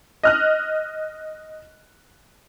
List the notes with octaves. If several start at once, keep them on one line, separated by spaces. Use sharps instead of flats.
D#5 F6 F#6